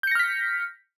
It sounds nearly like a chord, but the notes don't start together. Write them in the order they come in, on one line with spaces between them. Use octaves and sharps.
G6 C#7 A#6 F6 B6